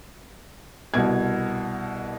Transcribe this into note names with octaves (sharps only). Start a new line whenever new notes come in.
C2 B2 G#6